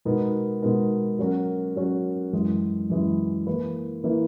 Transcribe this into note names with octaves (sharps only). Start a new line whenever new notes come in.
B2 G#3 B3 D#4 A#4
B2 G#3 B3 D#4 A#4
F#3 C#4 F#4 A#4
F#3 C#4 F#4 A#4
F#2 E3 G#3
F#2 E3 G#3
E3 A#3 E4 B4
E3 A#3 E4 B4